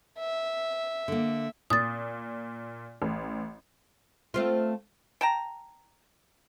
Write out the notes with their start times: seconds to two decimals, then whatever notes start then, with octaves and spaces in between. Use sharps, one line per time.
0.19 E5
1.08 D3 A#3
1.70 A#2 D#6 A6
3.02 A1
4.34 A3 C4 F4
5.21 G5 A5 A#5